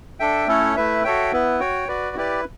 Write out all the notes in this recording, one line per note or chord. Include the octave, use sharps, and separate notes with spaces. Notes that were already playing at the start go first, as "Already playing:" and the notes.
D4 A4 E5 G5
A3 C#4 E4 A4 C#5
A3 E4 B4 E5
F#4 A4 C#5 E5 G5
B3 E4 B4
F#4 C#5 G5
F#4 B4 D5
E4 G4 B4 D5